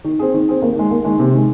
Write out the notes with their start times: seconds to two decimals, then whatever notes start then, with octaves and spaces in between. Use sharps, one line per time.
0.04 D#3
0.19 C4 G#4
0.34 D#3
0.48 C4 G#4
0.62 D#2
0.76 D#3 G#3
0.91 D#2
1.05 D#3 G#3
1.19 C3
1.33 D#3 G#3